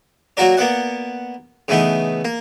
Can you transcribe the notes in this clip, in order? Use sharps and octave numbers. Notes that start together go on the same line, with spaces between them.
F#3 A#3 F#4 A#4 D5
A#3 B3 D5 F#5
C#3 E3 A3 B3 D#4
A#3